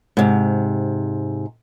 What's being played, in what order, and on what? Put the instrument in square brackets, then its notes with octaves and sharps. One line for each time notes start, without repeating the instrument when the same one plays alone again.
[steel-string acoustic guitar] G#2 C3